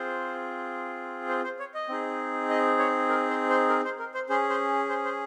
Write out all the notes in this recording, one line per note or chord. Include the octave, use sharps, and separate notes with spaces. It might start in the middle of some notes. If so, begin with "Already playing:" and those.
Already playing: C4 F4 G#4 C5
C5
C5
C#5
D#5
C4 D#4 G#4
D#5
C#5
A#4
C5
C5
A#4
C5
A#4
C5
C#4 G#4 C5
C5
C5
C5